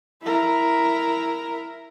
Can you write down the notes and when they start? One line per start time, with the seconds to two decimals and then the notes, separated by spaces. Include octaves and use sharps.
0.22 E4 A#4